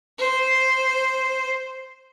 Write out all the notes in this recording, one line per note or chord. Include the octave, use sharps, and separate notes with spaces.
C5